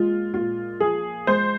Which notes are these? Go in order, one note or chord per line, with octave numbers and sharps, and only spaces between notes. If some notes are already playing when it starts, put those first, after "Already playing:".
Already playing: A#2 G#3 F4
A#2 F4
F3 G#4
G#3 C5